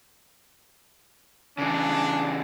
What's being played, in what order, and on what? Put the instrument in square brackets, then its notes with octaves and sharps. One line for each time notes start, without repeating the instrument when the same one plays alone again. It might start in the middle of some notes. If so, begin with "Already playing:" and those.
[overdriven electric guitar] C#3 E3 [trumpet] D4